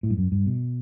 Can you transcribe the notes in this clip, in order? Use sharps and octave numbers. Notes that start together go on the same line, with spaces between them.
A2
G2
F#2
G2
B2